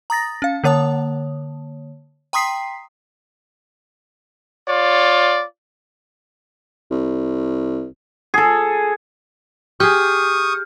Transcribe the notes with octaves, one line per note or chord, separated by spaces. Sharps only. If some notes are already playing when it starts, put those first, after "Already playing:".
A#5 D#6 A6 A#6
C#4 F5
D3 A#3 C#5 A5 D#6
G5 A#5 C6 D#6 B6 C7
F4 C#5 D5
C2
G#4 A4
G4 G#4 C#6 D#6 F6 G6